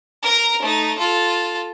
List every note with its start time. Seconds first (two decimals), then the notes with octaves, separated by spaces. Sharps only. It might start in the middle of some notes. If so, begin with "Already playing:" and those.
0.23 A#4 A#5
0.62 A3 D#4
0.98 F4 A4